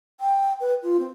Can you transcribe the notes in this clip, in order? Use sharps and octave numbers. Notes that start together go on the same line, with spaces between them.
G5
B4
F4
C4